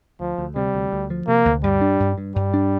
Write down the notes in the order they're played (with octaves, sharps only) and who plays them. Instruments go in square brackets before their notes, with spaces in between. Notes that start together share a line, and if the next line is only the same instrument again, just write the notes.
[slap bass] D2 [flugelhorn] F3
[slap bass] D2
[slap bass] C3 [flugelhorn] G3
[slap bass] D2
D2
F3
[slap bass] C3 [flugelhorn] A#3
[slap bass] D2
[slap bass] G2 [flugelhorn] G3
[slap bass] D4
G2
G2
[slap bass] G2 [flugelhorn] G3
[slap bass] D4